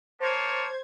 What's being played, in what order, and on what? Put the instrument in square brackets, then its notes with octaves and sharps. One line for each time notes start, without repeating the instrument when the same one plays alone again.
[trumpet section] A#3 C#5 A5 [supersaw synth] C5 G#6